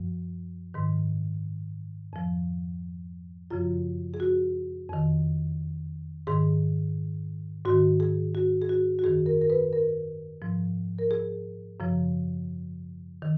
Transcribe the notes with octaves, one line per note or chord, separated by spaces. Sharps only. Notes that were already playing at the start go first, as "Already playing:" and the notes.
Already playing: F#2 F3
G#2 D#3
F2 F3
F#2 C#3 F3 F4
G#4
F#4
F2 D#3
G#2 D#3 G#4
G#2 D#3 F#4
G#4
F#4
G#4
F#4
F#4
F#2 D#3 G#4
A#4
A#4
B4
A#4
G#2 F3
A#4
G#4
F#2 C#3 F3
D#3